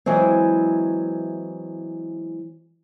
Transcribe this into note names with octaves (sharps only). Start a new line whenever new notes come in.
E3 F#3 G#3 C4